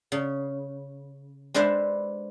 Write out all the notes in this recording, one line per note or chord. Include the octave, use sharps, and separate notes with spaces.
C#3
G#3 D4 A4 B4 C5 E5